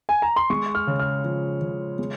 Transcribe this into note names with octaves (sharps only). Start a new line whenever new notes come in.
G#5
A#5
C6
G#3 C#6
F6
C#3
F6
F3
C#3
G#3